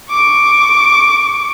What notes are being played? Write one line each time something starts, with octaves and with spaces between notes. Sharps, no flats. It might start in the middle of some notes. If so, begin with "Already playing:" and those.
C#6 D6